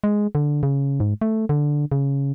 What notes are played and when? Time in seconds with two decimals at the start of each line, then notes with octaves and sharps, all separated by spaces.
0.04 G#3
0.35 D3
0.63 C#3
1.00 G#2
1.21 A3
1.49 D3
1.92 C#3